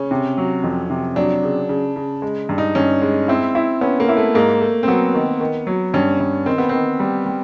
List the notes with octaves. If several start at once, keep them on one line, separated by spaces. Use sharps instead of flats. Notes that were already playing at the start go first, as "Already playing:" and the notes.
Already playing: C#3 C#4
C3
F#3
F2
C3
F#3 D4
C#3
C#3
C#3
G#3
G2
D#4
G2 C#4
G#3
C4 E4
E4
B3 C#4
A#3
E4
A3
G#2 A#3
A3
C4
F#3 B3
D#3
D#3
F#3
G2 C#4
G2
D#3 C4
B3
D#3 C4
G3
G3